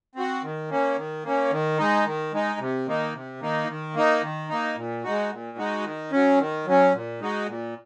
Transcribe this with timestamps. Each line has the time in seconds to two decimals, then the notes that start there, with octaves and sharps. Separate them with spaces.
0.15 C4 F#4
0.43 D#3
0.70 A#3 C#4
0.97 D#3
1.24 A#3 C#4
1.51 D#3
1.78 G#3 D#4
2.05 D#3
2.32 G#3 D#4
2.60 C3
2.87 D#3 A#3 D#4
3.13 C3
3.41 D#3 A#3 D#4
3.68 D#3
3.95 A#3 D#4
4.22 D#3
4.49 A#3 D#4
4.76 A#2
5.04 G#3 D#4 F#4
5.31 A#2
5.58 G#3 D#4 F#4
5.84 D#3
6.12 F#3 C#4
6.39 D#3
6.66 F#3 C#4
6.93 A#2
7.20 G#3 D#4 F#4
7.47 A#2